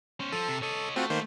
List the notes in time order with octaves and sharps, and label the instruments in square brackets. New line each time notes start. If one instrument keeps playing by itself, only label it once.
[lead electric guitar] C#4 C5
[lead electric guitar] F3 [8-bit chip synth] A4
[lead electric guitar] C3
[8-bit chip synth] A4 [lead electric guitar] C#5 D#5
[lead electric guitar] A3 [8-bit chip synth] C4 F4 F#4
[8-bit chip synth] D#3 A#3 C5